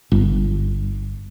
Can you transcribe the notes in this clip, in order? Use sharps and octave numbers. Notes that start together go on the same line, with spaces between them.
G1